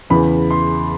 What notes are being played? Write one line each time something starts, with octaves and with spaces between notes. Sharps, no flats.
E2 C#3 E3 B5
C6